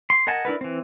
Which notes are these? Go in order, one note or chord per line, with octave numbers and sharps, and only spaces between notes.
C6
A#4 D#5 F#5 G#5 A5
D4 E4 A#4 B4
E3 C4